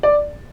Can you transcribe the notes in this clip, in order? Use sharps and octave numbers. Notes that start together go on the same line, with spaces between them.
D5